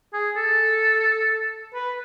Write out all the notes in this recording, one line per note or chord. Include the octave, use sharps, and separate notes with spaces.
G#4
A4
B4